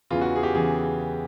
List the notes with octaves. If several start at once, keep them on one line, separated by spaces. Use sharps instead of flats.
E2 C#3 E3 F4
F#4
G#4
G4
E2 C#3 E3 G#4